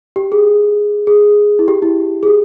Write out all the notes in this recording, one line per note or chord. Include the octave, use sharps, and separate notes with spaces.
G4
G#4
G#4
E4
G4
E4
G#4
G4